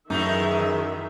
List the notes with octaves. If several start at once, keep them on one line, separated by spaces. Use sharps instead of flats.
F#2 D#3 E3 G#3 A3 D#4 E5